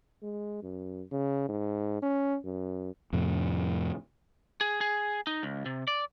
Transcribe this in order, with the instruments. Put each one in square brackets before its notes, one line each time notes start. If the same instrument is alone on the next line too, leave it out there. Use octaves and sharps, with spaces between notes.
[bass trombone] G#3
F#2
C#3
G#2
C#4
F#2
[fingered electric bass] F2 A2 C3
[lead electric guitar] G#4
G#4
D#4
C#2
C3
D5